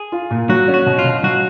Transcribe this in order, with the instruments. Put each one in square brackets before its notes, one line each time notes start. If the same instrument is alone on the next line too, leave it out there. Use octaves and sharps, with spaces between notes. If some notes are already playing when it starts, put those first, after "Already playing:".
Already playing: [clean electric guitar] G#4
[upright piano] F4
A#2
[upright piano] F#3 [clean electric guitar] F#4
[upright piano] C#4
[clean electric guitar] F#4
[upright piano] B2
[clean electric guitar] F4
[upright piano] B2
[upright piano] F#3 [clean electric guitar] F#4